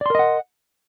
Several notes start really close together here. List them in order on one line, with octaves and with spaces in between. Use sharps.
D5 C6 A#4 D#5 F#5